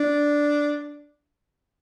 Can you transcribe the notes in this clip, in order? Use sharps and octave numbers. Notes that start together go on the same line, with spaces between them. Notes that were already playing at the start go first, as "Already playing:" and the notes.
Already playing: D4